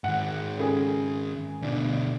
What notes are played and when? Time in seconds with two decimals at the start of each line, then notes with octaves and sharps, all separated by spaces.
0.04 G#2 D#3 F#5
0.58 C#3 G#4
1.62 D2 B2 D4